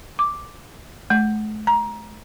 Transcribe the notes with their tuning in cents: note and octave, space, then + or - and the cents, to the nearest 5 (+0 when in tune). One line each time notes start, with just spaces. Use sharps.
D6 +0
A3 -45
A#5 +20